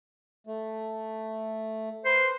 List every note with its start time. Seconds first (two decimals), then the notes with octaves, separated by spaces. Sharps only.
0.47 A3
2.05 B4 C5